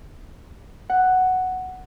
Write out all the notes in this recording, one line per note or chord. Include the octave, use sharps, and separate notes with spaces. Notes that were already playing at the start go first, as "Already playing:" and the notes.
F#5